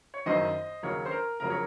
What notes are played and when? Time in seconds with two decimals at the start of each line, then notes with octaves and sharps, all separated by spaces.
0.14 C#5
0.26 F#1 F#2 D#3 C5 D#5
0.83 D#2 C#3 F#3 A#4 C#5
1.05 C5
1.11 A#4
1.40 F2 C#3 F#3 A#4
1.50 A#4 C#5